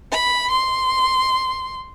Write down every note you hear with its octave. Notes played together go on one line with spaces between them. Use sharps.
B5
C6